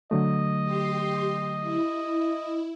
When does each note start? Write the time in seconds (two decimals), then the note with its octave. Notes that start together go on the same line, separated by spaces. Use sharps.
0.11 D3 F#3 A3 D#5
0.64 G4 C6
1.60 E4